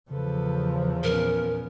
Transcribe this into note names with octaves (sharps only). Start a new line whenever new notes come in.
E2 C#3 F3 A4 B4
A#2 B3 C#4 A#4